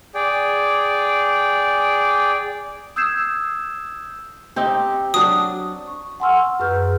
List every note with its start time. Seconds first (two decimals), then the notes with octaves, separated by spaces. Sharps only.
0.15 G#4 D5 G5
2.96 D#6 E6 G6 G#6 C7 E7
4.56 C4 D#4 G4
5.14 F#3 D4 D#6
5.87 C#6
6.20 F#5 G#5 C6 C#6 E6 F6
6.60 F#2 G#4 B4 C#6 F6 G6